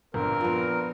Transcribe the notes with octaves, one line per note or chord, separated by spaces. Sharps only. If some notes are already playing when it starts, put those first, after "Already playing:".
G1 A#2 C4 A#4
F3 B3